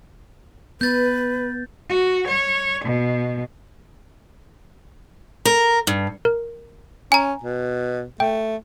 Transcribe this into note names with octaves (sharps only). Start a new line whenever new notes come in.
B3 B4 G6 A6
F#4
C#5
B2
A#4
G2
A#4
C#4 G#5 A#5
B2
A3 G5